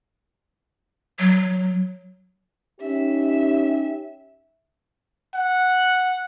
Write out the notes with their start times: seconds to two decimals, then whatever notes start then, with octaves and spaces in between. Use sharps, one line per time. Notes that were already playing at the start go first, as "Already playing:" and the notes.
1.19 F#3
2.81 C#4 D#4 G4 E5
5.34 F#5